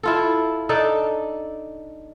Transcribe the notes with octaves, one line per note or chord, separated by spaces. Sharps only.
E4 F4 A4
D4 D#4 A4